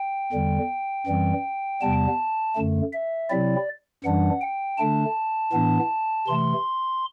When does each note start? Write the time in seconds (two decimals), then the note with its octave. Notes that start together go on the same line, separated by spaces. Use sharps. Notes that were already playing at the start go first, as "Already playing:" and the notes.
Already playing: G5
0.32 E2 D3 G3
1.07 F#2 E3 G3 C4
1.81 E2 C3 G3 B3 A5
2.55 F#2 D3 A3
2.93 E5
3.30 C3 F#3 C4 E4 D5
4.04 F#2 E3 G3 D4 F#5
4.41 G5
4.78 D3 A3 D4 A5
5.53 A2 E3 B3 D4
6.27 C3 E3 A3 C6